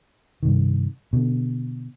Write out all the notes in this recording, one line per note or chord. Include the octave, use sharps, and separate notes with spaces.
G2 C3 D#3
B2 D3